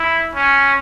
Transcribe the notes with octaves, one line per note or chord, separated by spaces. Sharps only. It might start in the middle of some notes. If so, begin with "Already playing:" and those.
Already playing: E4
C#4